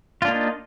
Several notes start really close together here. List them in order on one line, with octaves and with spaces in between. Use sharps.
F4 D4 A#3 D#4